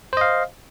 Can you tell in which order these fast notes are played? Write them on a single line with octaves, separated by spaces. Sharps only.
C5 D#5 F5